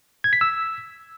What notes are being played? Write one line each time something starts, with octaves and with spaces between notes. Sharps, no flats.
G#6
B6
E6